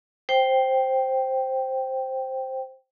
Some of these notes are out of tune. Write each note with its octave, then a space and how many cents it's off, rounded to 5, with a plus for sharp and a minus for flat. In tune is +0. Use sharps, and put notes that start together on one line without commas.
C5 +5 G5 -5